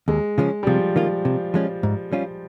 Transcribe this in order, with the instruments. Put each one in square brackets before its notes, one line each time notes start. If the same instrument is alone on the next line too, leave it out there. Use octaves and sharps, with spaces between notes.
[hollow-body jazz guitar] D#2 [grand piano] G#3
[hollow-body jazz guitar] C#3 F3 G#3 C#4
[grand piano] G3
[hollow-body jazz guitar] C3 [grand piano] F3
[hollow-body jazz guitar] D#3 A#3 F4
C3
F3 G#3 C#4 F4
G#2
G3 C#4 F4